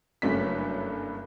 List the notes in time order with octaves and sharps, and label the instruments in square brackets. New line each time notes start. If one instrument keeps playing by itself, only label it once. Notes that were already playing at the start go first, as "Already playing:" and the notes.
[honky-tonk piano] F#1 G2 F#3 A3 C#4 B6